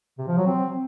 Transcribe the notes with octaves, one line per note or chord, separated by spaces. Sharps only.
C3
F3
F#3
C4